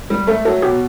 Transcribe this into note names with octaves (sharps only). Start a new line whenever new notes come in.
G3
A3 A4
F#3 A4
B2 G4